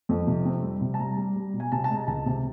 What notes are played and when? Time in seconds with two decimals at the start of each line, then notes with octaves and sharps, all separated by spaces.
0.09 F2
0.27 C3
0.45 C4
0.63 G3
0.81 C3
0.94 A5
0.99 G3 A#5
1.17 G3
1.36 G3
1.54 B2
1.60 G#5
1.72 C3 A5
1.84 A5
1.90 G#3
1.96 A#5
2.08 C#2 A5
2.26 C3